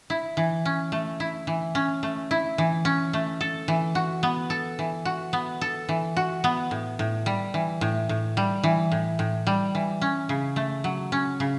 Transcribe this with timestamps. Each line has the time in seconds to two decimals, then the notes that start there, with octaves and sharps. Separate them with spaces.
0.10 E4
0.37 E3
0.65 C#4
0.92 A3
1.20 E4
1.47 E3
1.75 C#4
2.03 A3
2.31 E4
2.58 E3
2.85 C#4
3.13 A3
3.41 A4
3.68 E3
3.95 F#4
4.23 B3
4.50 A4
4.79 E3
5.05 F#4
5.33 B3
5.61 A4
5.89 E3
6.17 F#4
6.44 B3
6.71 A2
6.99 A2
7.26 G3
7.54 E3
7.81 A2
8.09 A2
8.37 G3
8.63 E3
8.92 A2
9.19 A2
9.47 G3
9.75 E3
10.02 C#4
10.29 C#3
10.56 A3
10.84 F#3
11.12 C#4
11.40 C#3